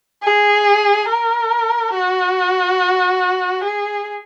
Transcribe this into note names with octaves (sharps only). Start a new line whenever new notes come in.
G#4
A#4
F#4
G#4